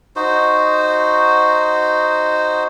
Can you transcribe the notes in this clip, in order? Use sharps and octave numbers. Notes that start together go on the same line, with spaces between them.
D#4 F#4 C5